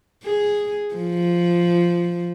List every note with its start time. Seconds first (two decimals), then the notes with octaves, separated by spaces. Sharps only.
0.24 G#4
0.95 F3